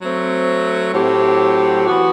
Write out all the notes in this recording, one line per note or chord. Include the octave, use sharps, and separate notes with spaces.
F#3 A3 C4
A2 F#3 C4 G4
E3 B3 F#4